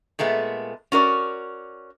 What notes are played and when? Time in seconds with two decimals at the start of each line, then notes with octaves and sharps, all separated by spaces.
0.19 A#2 G#3 A3 B3
0.92 C#4 F#4 A#4 D5